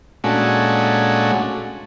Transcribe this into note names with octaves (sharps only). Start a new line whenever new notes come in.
A#2 G#3 A3 C#4 D4 F#4